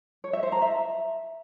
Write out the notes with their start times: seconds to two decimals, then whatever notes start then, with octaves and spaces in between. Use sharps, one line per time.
0.24 C#5
0.33 E5
0.43 C5
0.52 A#5
0.62 E5